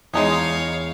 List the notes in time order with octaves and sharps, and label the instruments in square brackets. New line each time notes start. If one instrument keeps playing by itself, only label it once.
[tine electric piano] E2 E4 [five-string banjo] G#3 D#4 G#4 [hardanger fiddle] C#5 F5